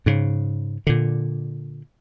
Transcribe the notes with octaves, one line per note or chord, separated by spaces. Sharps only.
G#2 C#3
A#2 D3